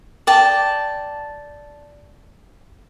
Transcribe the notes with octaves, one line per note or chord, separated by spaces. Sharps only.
D5 G5 A5